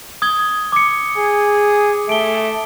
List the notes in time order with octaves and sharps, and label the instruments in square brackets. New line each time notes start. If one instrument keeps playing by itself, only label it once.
[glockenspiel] D#6 G#6 G7
D6 C#7
[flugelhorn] G#4
[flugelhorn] A3 [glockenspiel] D7 G7